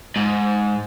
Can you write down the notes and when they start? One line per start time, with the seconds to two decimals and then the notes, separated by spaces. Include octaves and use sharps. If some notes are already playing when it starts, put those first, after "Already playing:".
0.16 G#2